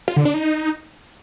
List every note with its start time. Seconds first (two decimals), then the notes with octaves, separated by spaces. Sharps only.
0.08 F4
0.17 D3
0.25 D4
0.34 D#4